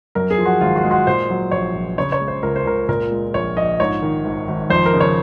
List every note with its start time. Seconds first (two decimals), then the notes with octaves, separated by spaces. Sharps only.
0.15 F#2 A#4
0.31 G#4
0.38 F3
0.46 F#4
0.61 G#1 F4
0.76 F#4
0.84 G#3
0.91 F#4
1.07 A#2 C5
1.30 F#3
1.51 A#1 C#5
1.74 A#1
1.98 C#3 C#5
2.12 C#5
2.21 G#3
2.28 C5
2.42 C#2 A#4
2.56 C5
2.65 C#2 A#4
2.88 A#2 A#4
3.11 G#3
3.34 A#1 C#5
3.57 A#1 D#5
3.80 G#2 C#5
4.02 D#3
4.25 G#1
4.48 G#1
4.70 F2 C5
4.86 A#4
4.94 C#3
5.00 C#5